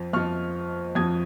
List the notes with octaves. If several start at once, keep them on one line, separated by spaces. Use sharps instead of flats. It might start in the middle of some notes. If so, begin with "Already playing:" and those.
Already playing: F2 F3
F2 F3 C#6 F6
F2 F3 D#6 G#6